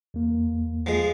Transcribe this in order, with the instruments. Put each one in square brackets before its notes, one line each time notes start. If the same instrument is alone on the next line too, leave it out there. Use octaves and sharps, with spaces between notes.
[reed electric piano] E2 A#3
[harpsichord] F3 G#3